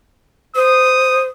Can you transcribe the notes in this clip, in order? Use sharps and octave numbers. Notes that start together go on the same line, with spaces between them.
C5 D#6